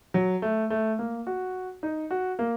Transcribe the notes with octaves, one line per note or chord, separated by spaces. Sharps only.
F#3
A3
A3
A#3
F#4
D#4
F#4
A#3